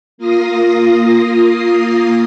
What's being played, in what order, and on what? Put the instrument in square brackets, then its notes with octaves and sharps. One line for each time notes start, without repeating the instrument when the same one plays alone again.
[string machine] A#3 F4 D#6 A#6 C7